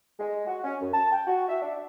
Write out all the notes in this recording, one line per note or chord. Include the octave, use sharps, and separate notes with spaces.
G#3
F#4
C#4
F#2
A5
G5
F#4
E5
D4